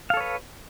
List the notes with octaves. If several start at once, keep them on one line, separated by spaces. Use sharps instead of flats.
A4 B4 C#5 F5